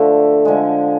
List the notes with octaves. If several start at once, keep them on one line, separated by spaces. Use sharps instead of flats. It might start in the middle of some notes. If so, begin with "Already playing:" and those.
Already playing: D3 F3 A3
D3 F3 G#3